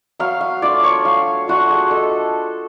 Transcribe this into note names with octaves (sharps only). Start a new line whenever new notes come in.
F#3 F5
F5
A3 D4 F4 D5
C#5
F#3 F5
A3 D4 F4 F#4
G#4
G#3 A4